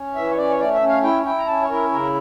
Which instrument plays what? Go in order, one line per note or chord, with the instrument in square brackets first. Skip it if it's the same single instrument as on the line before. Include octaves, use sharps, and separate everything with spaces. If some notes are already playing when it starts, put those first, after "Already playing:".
Already playing: [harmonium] C#4
E3 E5
C#5
C#4 D5
C#5
A3 D5
E5
C#4
F5
E4 G5
E4 G5
A#5
C#4 A5
C#5
E4 A#4
C#3 A#4